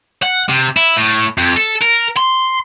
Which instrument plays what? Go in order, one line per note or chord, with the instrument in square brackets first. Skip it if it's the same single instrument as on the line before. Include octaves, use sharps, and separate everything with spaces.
[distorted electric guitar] F#5
C3
E4
A2
F2
A4
A#4
C6